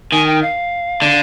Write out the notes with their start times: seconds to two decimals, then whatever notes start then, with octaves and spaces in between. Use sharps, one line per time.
0.12 D#3 G#5
0.27 G5
0.42 F5
1.02 D3